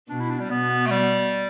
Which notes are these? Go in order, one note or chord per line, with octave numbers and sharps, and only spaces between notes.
B2 D4
E4
D4
G3
B2 B3
A3
G3